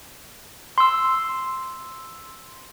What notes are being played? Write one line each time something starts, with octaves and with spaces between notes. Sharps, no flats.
C6 E6